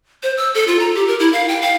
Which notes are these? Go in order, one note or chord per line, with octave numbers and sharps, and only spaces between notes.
C5
E6
A4
F4
A#5
G4
A#4
E4
F5
G5
F5